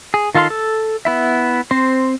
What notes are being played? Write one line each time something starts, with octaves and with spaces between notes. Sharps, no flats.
G#4
D#3 F4 A4 F5 C6
A4
B3 E4 E5
C4 C5